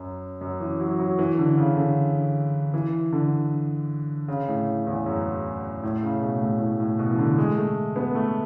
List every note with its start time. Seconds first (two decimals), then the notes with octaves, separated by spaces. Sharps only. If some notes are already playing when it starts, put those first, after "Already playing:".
Already playing: F#2
0.41 F#2
0.60 E3
0.80 F#3
0.99 F#3
1.19 E3
1.38 D3
1.57 C#3
1.77 D3
2.74 E3
3.13 D3
4.28 C#3
4.48 A2
4.87 E2
5.06 F#2
5.83 A2
6.03 C#3
6.22 B2
6.41 A2
6.61 A2
6.80 A2
6.99 B2
7.11 E3
7.18 D3
7.38 G#3
7.57 A3
7.96 B3
8.15 A3